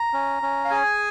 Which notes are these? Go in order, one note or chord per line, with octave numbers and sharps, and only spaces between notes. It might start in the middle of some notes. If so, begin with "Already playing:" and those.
Already playing: A#5
C#4
C#4
F5
G#4 G#5